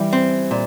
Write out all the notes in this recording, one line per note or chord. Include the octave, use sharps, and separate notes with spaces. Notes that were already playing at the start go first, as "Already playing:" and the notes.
Already playing: E3 G3
C4
A#2